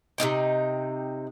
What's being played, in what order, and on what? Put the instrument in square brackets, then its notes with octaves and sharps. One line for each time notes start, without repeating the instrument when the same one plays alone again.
[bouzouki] C3 C#4 D#4 G5